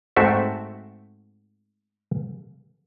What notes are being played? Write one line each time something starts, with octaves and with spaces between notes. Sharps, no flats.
G#2 A3 C4 F#4 E5